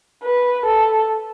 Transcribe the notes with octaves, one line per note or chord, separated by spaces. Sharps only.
B4
A4